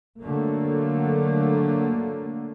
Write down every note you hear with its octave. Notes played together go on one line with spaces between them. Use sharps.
D3 F#3 A3 A#3